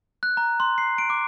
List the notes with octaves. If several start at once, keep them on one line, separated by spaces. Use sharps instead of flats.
F#6
A#5
C6
C7
D7
D6